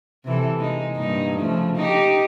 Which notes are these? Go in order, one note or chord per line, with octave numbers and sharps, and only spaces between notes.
C3 E3 A4
G#3 D#4
G2 A#2 D#4
C#3 F3 A3
D#4 G4